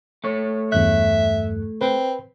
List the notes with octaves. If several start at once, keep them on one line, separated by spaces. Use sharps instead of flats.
A3 C#5
E2 G2 E5 F#6
C4 B4